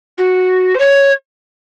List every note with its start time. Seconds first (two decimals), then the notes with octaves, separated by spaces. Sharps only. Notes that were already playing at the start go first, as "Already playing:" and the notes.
0.17 F#4
0.74 C5
0.79 C#5